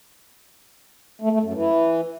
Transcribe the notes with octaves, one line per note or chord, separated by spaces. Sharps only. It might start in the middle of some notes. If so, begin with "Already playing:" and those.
A3
A3
F#2
E3